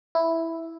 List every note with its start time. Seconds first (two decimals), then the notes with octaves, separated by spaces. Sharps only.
0.15 E4